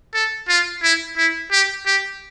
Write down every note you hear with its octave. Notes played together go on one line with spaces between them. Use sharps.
A4
F4
E4
E4
G4
G4